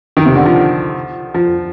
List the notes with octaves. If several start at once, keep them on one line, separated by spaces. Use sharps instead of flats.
D#3
C3
D3
F3
F3